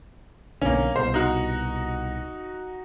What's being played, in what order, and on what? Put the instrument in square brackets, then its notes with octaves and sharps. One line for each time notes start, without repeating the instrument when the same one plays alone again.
[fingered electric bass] B1 F#2 D3 [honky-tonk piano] A#3 C#4
[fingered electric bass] C2 B2 [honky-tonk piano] C5
[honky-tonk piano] D#4 F#4